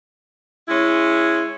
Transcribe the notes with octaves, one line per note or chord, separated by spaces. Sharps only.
G#3 C#4 E4